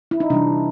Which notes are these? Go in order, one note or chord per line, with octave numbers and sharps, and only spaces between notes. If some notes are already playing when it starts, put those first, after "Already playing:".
E4
D#4
C3 E3 G3 D4